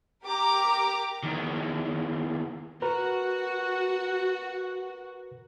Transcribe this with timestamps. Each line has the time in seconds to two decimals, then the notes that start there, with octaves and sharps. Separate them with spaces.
0.22 G4 A#4 A#5 D6
1.23 E2 D#3
2.82 F#4 A#4 B4 A#5